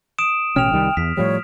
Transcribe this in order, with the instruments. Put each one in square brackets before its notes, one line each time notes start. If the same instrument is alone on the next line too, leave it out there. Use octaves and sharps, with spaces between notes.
[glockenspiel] D#6 D7 E7
[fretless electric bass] A1 B2 C#4 [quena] G5 [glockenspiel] F6 F7
[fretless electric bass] C2 D#3 G3
[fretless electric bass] E2 [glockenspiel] B6
[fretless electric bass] A2 F3 G3 [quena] C#5